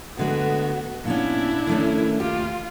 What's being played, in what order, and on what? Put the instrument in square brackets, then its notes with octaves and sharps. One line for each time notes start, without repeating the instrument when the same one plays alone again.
[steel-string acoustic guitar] D2 D3 G#3 [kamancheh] B3 F#4
[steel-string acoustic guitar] A#2 B3 C#4 [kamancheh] D4 E4
[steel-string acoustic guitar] D#3 A3 C#4
[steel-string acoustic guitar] D#2 G4 [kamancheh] F4